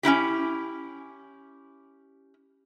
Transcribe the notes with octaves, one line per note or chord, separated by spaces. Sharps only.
C#4 D#4 E4 G4